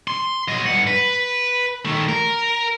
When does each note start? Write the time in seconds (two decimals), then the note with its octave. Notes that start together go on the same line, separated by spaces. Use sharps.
0.08 C6
0.48 F#3 D#5
0.66 G2 F#5
0.87 B4
1.85 D#3 A3
2.09 A#4